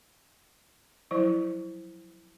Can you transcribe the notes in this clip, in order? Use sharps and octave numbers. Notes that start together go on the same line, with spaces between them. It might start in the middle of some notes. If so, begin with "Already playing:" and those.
F3 F#3 E4 C5